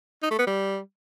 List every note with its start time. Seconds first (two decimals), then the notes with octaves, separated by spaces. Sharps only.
0.23 D#4
0.31 A3
0.39 B3
0.47 G3